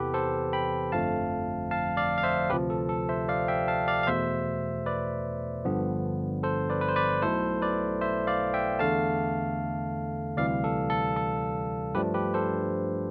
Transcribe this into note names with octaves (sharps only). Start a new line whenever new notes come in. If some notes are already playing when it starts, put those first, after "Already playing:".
Already playing: E2 C3 E3 B3 G4 A4 B4
A4 C5
G5 B5
G1 F2 D3 F3 A3 F5 A5
F5 A5
D5 F5
F5
C5 E5
D2 C3 F3 G4 B4
A4
A4
C5 E5
D5 F5
E5 G5
F5 A5
D5 F5
F5
E2 B2 A3 C5 E5
B4 D5
G1 G2 D3 F3 B3
A4 C5
B4 D5
B4
C5
B4 D5
B1 B2 A3 E4 A4 C5
B4 D5
C5 E5
D5 F5
E5 G5
E2 D3 A3 F5 A5
D2 C3 E3 G3 D5 F5
A4
A4
A4
G2 F3 A3 D4 G4 B4
G4 B4
A4 C5